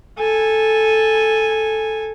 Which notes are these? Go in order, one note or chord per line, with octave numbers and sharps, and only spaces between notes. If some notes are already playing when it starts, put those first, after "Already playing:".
A4 G#5